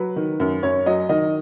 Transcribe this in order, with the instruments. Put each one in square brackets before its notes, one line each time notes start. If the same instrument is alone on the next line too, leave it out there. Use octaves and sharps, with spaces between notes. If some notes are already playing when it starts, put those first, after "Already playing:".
Already playing: [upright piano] F#3 B4
D#3
F#2
F#2 C#5
F#3 D#5
D#3 D#5